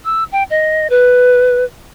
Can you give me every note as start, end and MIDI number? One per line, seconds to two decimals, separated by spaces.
0.05 0.24 88
0.32 0.43 79
0.50 0.88 75
0.90 1.65 71